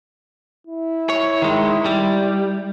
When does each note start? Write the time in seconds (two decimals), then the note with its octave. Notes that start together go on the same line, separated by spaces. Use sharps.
0.67 E4
1.10 C#5
1.42 D#3 G#3
1.85 G3